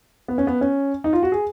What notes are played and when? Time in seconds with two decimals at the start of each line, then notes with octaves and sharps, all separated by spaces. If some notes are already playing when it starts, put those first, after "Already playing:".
0.28 B3
0.38 C#4
0.47 B3
0.61 C#4
1.04 D#4
1.13 F4
1.23 F#4
1.32 G#4